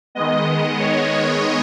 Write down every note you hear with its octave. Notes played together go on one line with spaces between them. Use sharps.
D#3 G#3 B3 D#5
D#5
C#5